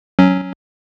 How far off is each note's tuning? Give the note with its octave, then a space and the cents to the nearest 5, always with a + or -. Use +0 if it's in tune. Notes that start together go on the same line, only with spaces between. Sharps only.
F#3 +0 C#4 +0